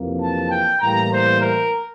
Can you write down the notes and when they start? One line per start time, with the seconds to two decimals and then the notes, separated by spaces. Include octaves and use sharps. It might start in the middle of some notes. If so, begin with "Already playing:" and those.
Already playing: F2 C3 E3 A#3
0.22 A5
0.51 G5
0.81 A2 E3 G3 A#3 A#5
1.11 C5
1.41 A#4